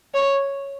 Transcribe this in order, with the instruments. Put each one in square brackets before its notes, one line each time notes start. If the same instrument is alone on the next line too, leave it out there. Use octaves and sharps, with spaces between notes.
[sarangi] C#5